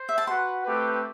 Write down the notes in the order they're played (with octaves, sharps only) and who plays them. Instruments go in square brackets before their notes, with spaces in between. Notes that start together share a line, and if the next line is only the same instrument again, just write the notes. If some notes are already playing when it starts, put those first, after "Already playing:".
Already playing: [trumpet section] C5
[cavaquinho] E5
A5
[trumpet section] F#4 B4 F#5 [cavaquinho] C6
[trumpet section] A3 C4 G4 B4